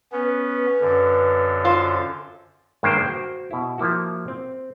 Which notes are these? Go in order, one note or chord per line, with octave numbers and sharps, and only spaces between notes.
B3 C#4 B4
F#2 D3
F4 C5
G2 D#3 G#3 A#3 C5 G5
F#4 C5
B2 E4
F3 A#3 E4 F#4
C4